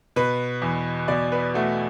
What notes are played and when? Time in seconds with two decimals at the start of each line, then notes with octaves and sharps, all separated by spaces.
0.16 B2 B4
0.62 E2
1.08 B2 D5
1.32 B4
1.54 A3 F#4